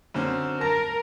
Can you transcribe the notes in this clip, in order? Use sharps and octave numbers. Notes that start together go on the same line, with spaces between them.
F#2 D3 C4
A#4 A5 A#6